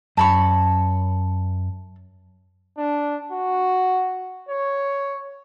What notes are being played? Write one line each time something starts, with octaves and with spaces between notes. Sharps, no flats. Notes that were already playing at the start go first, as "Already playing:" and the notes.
F#2 A5 B5 C#6
D4
F#4
C#5